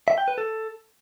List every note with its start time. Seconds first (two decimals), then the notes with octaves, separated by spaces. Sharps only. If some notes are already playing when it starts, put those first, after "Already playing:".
0.08 E5
0.18 G5
0.28 B4
0.38 A4